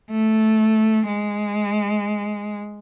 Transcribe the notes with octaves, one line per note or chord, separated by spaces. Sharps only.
A3
G#3